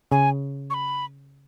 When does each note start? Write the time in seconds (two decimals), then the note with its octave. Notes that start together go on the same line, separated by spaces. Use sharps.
0.12 C#3 G#5
0.70 C#6
0.74 B5